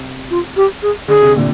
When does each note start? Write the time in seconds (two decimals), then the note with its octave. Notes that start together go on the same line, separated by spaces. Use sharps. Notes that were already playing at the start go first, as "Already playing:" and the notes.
Already playing: C3
0.31 F4
0.57 G4
0.83 G#4
1.08 D3 G#4
1.22 C3
1.36 A#2 D3